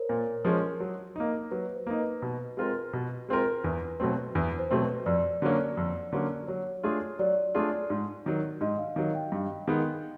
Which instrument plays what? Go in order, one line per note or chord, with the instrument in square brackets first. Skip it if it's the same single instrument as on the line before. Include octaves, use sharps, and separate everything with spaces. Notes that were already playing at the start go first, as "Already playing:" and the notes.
Already playing: [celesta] A#4 C5 C#5
[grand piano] A#2
F3 G#3 C#4
F#3
A#3 D#4
[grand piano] F#3 [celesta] B4
[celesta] C5
[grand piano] A#3 D#4
[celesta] B4
[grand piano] B2
G#3 C4 F4 A#4
B2
G#3 C4 F4 A#4
[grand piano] E2 [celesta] B4
[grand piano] B2 F#3 A3 C4
[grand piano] E2 [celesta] B4
[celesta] C5
[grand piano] B2 F#3 A3 C4
[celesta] B4
[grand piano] F2 [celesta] D5
[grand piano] D3 F#3 A#3 C#4
F2
D3 F#3 A#3 C#4
[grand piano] F#3 [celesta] C#5
[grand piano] A3 D4 F4 G#4
[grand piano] F#3 [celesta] D5
[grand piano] A3 D4 F4 G#4
G#2
D#3 F#3
[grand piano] G#2 [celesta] D#5
[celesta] F5
[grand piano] D#3 [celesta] F5
[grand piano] F#3
[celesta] G5
[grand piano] G2
D#3 G#3 B3